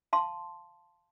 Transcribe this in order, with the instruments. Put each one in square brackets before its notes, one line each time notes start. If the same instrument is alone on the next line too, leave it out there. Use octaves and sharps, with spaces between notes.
[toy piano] F5 A5 C6